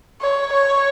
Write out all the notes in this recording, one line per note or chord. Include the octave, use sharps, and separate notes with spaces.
C#5
C#5